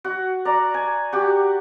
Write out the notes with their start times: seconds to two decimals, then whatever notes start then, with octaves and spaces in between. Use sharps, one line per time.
0.04 F#4
0.45 D5 A#5
0.74 G#5
1.12 F#4 G4